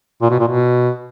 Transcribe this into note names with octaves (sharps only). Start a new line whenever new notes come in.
A#2
B2
A#2
B2